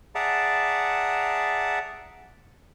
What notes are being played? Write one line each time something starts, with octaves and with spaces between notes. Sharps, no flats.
G#4 D5 E5 F#5 A5 A#5